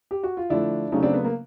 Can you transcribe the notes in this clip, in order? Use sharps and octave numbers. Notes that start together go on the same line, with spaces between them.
G4
F#4
F4
D3 F3 A3 D4 E4
C#3 F#3 A3 C#4 D#4
C4 D4
B3
A#3